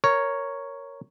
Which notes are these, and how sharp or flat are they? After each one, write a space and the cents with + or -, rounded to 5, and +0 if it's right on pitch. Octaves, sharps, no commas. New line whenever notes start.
A#4 +0 C#5 +0